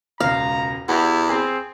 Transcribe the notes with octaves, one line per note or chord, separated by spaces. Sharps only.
E1 C#2 F5 A#5
E2 E4 F#4 G4
C4 G#4